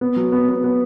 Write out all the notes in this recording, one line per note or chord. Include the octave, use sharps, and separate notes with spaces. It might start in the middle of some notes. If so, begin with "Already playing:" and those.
B3
F#3
B3
B3
B3